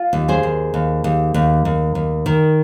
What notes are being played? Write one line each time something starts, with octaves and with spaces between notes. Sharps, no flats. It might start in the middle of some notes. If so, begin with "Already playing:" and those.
Already playing: F4
D#2
G#4 C5
D#2
D#2
D#2
D#2
D#2
D#2
D#3